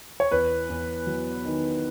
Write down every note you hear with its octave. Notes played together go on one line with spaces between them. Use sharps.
C#5
E2 B4
E2
F#3
D#3